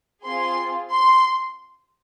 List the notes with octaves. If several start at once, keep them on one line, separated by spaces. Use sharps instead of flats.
C4 F4 G#4 C6
C6